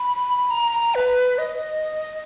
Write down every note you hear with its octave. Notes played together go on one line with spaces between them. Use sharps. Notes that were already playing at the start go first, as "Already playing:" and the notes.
Already playing: B5
A#5
B4
D#5